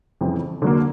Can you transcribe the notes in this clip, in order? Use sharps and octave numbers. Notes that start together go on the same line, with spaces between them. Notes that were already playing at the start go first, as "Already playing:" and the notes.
F2 C#3 E3 G3 C4
D3 F#3 A#3